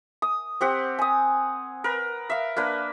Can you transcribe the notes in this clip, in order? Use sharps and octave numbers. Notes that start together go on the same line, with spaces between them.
D#6
C4 G4 F#5
G#5 D#6
A#4 B4
E5 F5
A#3 D4 B4